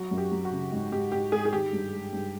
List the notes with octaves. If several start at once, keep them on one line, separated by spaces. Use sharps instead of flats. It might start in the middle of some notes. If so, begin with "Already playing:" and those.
Already playing: F#3 F#4
F#2
G4
F#3
F#4
C#3
G#2
G#2 G4
G#2 G4
G#2 G#4
G#4
D#3 G4
G2
G#3
G2